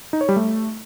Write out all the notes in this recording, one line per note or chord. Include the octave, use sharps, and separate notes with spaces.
D#4
C#5
G3
A3